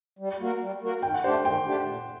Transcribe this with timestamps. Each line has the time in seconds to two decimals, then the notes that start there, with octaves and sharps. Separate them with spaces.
0.19 G3
0.40 A#3 F#4 A#4
0.61 G3
0.81 A#3 F#4 A#4
1.02 D#3 G5
1.14 F#5
1.24 A3 D4 G4 C5
1.45 D#3 G5
1.66 A3 D4 G4
1.87 A#2